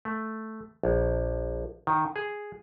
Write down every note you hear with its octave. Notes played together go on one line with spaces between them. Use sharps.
A3
A#1
D#3
G#4